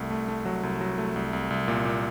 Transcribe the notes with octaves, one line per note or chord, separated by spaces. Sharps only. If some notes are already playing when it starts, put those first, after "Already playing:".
Already playing: C2 A3
A3
A3
F#3
C2
F#3
A3
C2
C2
C2
A#2
A#2